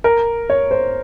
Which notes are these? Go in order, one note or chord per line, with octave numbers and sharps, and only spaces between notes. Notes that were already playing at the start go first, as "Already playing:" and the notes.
A#4
C#5
C5